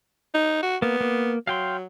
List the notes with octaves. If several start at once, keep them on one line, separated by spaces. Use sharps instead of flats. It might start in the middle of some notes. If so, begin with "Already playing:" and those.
D#4
F#4
A#3 B3
A#3
F#3 F5 G5 C6